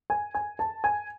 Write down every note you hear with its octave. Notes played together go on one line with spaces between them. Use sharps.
G#5
G#5
A5
G#5